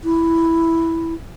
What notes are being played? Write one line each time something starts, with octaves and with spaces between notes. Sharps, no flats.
E4